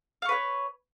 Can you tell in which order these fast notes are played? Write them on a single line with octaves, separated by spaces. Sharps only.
F5 C#6 B4 C#5